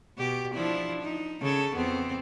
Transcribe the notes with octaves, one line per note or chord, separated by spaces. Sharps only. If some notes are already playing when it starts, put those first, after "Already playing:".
B2 G4
F3 D4 E4
D#4
C#3 A4
F2 B3 C4